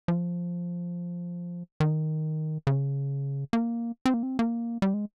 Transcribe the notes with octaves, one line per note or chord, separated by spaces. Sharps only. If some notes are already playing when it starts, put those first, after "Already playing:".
F3
D#3
C#3
A#3
C4
A#3
C4
A#3
G3
G#3